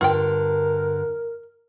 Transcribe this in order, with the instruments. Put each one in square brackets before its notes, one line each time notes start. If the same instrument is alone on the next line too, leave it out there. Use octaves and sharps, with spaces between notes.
[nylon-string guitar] G2 D3 [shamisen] F4 F#5 G5 [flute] A#4